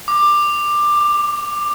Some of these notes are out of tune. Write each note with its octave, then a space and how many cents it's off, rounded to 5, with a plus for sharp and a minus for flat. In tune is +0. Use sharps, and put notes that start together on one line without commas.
D6 +15
D6 -15